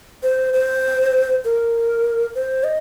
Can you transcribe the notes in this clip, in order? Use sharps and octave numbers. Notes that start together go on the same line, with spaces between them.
C5
C5
A#4
C5
D#5